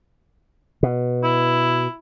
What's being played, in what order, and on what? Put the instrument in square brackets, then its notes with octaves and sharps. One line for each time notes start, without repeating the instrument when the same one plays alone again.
[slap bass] B2
[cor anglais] E4